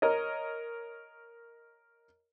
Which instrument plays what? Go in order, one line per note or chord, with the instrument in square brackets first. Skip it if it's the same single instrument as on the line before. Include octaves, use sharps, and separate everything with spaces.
[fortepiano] A#4 C#5 D#5